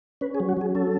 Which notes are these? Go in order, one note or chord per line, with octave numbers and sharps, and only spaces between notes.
C#4 B4
G#4
F#3
F#4
F#3 G#4
C#4 A4